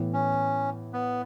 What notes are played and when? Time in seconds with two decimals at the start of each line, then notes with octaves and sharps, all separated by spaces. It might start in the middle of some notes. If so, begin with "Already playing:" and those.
Already playing: A2 E3 B3
0.13 C#4
0.93 B3